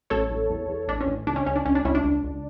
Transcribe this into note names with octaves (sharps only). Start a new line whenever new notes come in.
A1 A4 C#5
A1
E2
E2
A1 D4
C#4
A1
C#2 D4
C#4
C#2 C#4
D4
C#2 C#4
D4
C#2 C#4 E4
D4
C#2
C#2